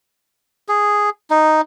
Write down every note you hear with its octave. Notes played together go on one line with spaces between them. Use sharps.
G#4
D#4